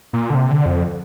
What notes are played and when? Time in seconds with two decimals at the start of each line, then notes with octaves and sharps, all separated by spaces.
0.13 A#2
0.30 D3
0.35 C3
0.51 D3
0.66 F2